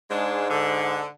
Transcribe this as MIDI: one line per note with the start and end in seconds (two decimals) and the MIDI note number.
0.10 1.05 44
0.10 0.47 56
0.10 0.47 62
0.50 1.08 50